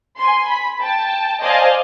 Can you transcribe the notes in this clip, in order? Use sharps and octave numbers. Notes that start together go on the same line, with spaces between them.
G#5 C6
B5
G5 A5
C5 D5 D#5 F5 G#5 A5